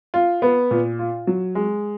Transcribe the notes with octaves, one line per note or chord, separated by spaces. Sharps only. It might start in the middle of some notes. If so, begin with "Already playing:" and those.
F4
B3
A#2
F4
F#3
G#3